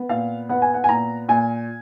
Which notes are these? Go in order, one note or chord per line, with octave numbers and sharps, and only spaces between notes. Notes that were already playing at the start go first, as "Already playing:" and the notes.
Already playing: B3
A#2 F5
B3 F#5
G#5
F#5
G#5
A#2 A#5
A#2 G#5